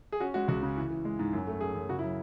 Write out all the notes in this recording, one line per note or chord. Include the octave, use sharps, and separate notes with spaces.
G#4
C#4 F#4
G#3 F#4
C#2 F#4
C#3
E3
E3
G#3
G#2
F#2
A3
F#2 G#4
F#2
C#3 F#4
E4
F#3